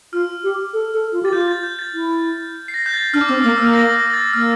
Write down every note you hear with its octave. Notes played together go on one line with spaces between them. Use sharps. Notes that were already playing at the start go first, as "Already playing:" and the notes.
F4 F6
G4
A4
A4
F4
G4 A6
F4 G6
A6
G6
A6
E4
C7
A#6
G6
A6
D4 F6
D6
C4 E6
A#3 E6
A#3 F6
A#6
A#6
A6
A#3 F6